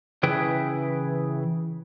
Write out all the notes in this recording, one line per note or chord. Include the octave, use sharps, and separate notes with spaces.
C#3 E3 E4 G#4 B4 G5